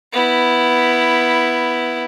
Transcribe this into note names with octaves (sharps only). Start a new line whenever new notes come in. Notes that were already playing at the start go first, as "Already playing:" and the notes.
B3 E4